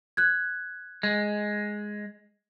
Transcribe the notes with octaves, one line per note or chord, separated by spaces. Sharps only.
F#6 G#6
G#3